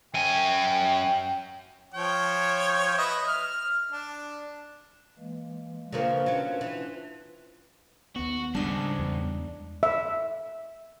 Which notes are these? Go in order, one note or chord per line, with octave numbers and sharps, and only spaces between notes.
F#2 G5 G#5
F3 C#5 G5
B4 D#5 E5
F6
D4
E3 G#3 A#3
C#3 F3 A#3 D4 F4 B4
F#3 C#4
E3
D#2 B3 F#4
G#2 C#3 G3 G#3 D4 D#5
E2
E5